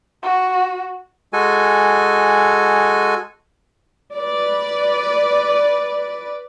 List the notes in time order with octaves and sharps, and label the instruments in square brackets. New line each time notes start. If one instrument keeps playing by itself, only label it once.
[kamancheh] F#4
[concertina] G#3 F#4 A4 G#5
[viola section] B4 D5